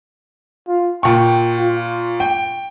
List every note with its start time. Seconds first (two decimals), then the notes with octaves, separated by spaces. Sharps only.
0.68 F4
1.03 A#2 G5 C#6
1.59 F4
2.20 G5